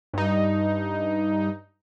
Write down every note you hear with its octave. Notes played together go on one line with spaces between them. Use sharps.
G2 D#4